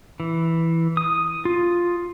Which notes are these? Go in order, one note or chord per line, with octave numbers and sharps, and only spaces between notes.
E3
D#6
F4